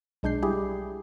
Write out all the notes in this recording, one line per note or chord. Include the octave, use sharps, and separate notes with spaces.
B1 G#3 D4 G6 C7
G3 E4 G4 G#4